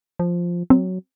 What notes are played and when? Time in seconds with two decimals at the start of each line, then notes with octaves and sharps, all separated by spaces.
0.19 F3
0.70 F#3 C4